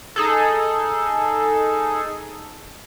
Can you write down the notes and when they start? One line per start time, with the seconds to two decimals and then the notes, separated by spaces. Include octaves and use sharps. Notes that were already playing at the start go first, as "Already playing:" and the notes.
0.16 D#4 G#4 A4